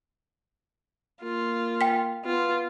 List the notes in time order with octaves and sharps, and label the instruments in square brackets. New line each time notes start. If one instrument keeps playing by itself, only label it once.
[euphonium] A#3 [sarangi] F4
[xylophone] G5 B6
[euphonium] B3 [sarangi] F4